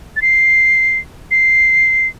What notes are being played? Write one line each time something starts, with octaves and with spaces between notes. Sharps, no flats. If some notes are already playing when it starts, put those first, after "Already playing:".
A6
C7
C7